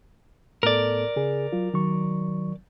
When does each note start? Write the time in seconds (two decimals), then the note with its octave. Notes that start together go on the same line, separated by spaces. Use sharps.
0.63 A2 B3 A4 A#4 D5
1.16 C#3 G#4
1.52 F#3 F4
1.74 D#3 F#3 C#6